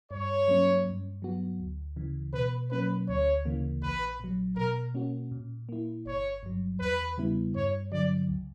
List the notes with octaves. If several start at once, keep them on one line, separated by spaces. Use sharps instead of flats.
G2 C#5
F#3 A#3 C#4
G2
F#3 B3 F#4
D2
C#3 E3
B2 B4
F#3 A#3 C#4 B4
D2 C#5
C#3 E3 A#3
A#1 B4
A#2 F#3
B2 A#4
A#3 C#4 F#4
A#2
A#3 E4
G1 C#5
G2 F#3
E2 B4
C#3 G3 B3 E4
G2 C#5
D3 F#3 D5
C#2